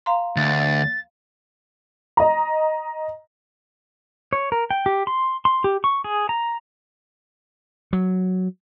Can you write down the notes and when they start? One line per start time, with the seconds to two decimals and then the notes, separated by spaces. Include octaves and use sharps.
0.06 F5 A#5 C6
0.36 D2 A6
2.17 D#5 A#5
4.33 C#5
4.52 A#4
4.71 G5
4.86 G4
5.07 C6
5.45 C6
5.64 G4
5.84 C#6
6.04 G#4
6.29 A#5
7.93 F#3